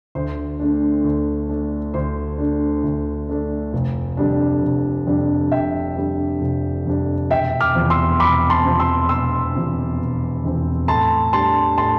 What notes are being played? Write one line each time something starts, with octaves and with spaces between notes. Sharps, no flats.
D2 C5
D3 A3 D4
D2
D3 A3 D4
D2 C5
D3 A3 D4
D2
D3 A3 D4
F1
F2 D3 G3 D4
F1
F2 D3 G3 D4
F1 E5 G5
F2 D3 G3 D4
F1
F2 D3 G3 D4
E1 E5 G5
D6 F6
E2 C3 F3 C4
C6 E6
E1 B5 D6
A5 C6
E2 C3 F3 C4
C6 E6
E1 C6 E6
E2 C3 F3 C4
E1
E2 C3 F3 C4
A2 A5 C6
G3 D4 A5 C6
A2 A5 C6